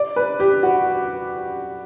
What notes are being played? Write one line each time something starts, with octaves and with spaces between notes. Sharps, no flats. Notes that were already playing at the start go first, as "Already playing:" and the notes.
Already playing: D5
B4
G4
F#4